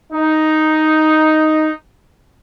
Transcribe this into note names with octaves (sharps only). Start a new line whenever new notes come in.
D#4